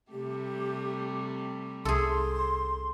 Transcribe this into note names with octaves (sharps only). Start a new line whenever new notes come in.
C3 G3 A3 G4
C2 G#4 A4 C6